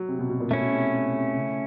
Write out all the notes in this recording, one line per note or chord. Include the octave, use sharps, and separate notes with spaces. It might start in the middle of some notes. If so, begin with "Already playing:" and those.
Already playing: F#3
C3
B2
B2
A#2
B2 A3 C#4 E4
B2
C3
C3
C3
C#3